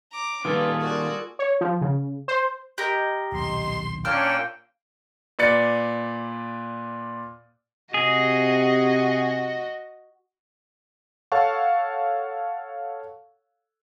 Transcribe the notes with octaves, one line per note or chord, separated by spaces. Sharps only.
A#5 D6
D#3 G3 A#3 B3 F4 G#4 A4 B4
F#4 A#4 D5
C#5
F3
C#3
C5
G4 A#4 D#5
D#1 B1 C6
A#2 A#3 C#4 D4 G5 A5 E6 F6
A#2 B4 D5 A6 C#7
C3 F#4 G#4 D#5
A4 C#5 F5 F#5 A5 C#6